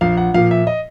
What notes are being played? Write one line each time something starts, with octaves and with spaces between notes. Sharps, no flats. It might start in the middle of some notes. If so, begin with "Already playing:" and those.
A#1 F5
F#5
A#2 F3 F5
E5
D#5